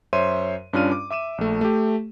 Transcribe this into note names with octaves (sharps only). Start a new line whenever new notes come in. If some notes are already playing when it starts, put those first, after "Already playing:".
F#2 C5 C#5 E5 C6 D#7
G2 C#4 D4 F4 F6 D#7
D6
E5 D6 D#7 E7
A#1 A3
A3 G4